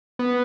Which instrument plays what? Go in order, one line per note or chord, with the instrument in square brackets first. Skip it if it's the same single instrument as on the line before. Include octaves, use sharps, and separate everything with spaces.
[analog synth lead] B3